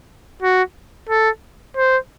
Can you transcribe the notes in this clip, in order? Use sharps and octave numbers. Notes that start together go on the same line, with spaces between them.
F#4
A4
C5